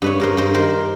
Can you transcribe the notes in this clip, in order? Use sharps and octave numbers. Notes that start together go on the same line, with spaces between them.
G2 B4 C#5
G2 A#4 C5
G2 A#4 C5
D#3 A#4 C5